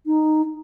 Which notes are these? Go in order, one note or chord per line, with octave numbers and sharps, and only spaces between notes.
D#4